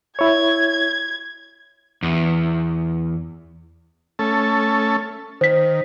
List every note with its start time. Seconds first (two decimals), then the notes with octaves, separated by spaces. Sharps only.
0.19 E4 C#5 G#6
2.03 E2
4.19 A3 C#4 A4
5.41 D#3 C5 B6